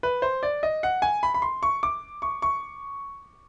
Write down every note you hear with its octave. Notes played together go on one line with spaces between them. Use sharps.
B4
C5
D5
D#5
F#5
G#5
B5
B5
C6
C#6
D6
C#6
C#6